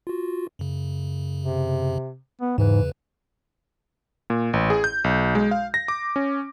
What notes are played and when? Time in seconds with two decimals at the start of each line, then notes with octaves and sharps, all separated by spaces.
0.07 F4 F#4
0.59 F#2 C#3
1.43 C3
2.41 B3
2.58 E2 G#2 C#3 E3 B4
4.30 A#2
4.53 A1
4.70 G#4
4.84 G6
5.04 B1
5.35 G#3
5.51 F5
5.74 A#6
5.88 D6
6.16 C#4